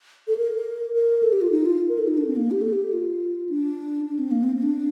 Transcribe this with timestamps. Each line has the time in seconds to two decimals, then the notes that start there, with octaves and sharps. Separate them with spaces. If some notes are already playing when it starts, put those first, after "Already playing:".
0.28 A4
0.37 A#4
0.94 A#4
1.23 A4
1.32 G4
1.41 F4
1.51 D#4
1.66 F4
1.89 A#4
1.99 A4
2.08 D#4
2.18 D4
2.27 C4
2.36 A#3
2.51 G4
2.61 A4
2.73 G4
2.93 F4
3.49 D4
4.06 D4
4.19 C4
4.31 A#3
4.43 C4
4.56 C4
4.63 D4